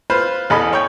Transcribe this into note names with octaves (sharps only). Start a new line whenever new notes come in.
F4 B4 C5
A1 E2 A4 D#5 G#5 B5
C#5 G5